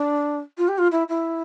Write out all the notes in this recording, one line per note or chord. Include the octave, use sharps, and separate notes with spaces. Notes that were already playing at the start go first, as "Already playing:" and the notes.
Already playing: D4
F4
G4
F4
E4
E4